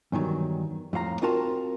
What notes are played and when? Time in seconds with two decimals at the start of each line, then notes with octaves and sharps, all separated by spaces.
0.12 E2 G2 D#3 F#3
0.93 F2 A2 F5 A#5
1.22 C4 F4 F#4 A#4 A5